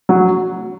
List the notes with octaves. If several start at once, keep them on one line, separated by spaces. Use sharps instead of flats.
F#3